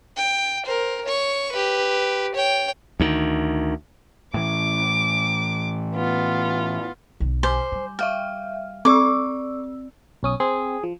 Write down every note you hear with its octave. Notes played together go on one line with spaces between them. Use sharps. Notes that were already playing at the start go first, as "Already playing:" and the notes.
G5
A#4 C5
C#5 C#6
G4 B4
C#5 G5
D2 D#3
A2 E3 D6
B3 F4
B1 D3
C5 G#5 D6
G3
E5 F5 G5 F6
C4 D5 C#6 D6 E6
B1 C#4 D#6
C4 G#4
F3